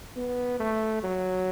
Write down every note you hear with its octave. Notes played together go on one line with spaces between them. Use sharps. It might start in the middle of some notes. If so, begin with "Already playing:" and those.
B3
A3
F#3